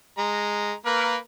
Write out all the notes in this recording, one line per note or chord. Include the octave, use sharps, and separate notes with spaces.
G#3 A#5
A#3 A#4 B4